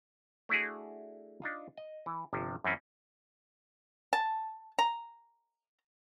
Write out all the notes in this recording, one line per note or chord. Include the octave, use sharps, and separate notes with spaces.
A3 D4 E4 F#4 G#4
D4 D#4 F4
D#5
E3
G1 C3 F3
F#2 E3 C4 C#4
A5
A#5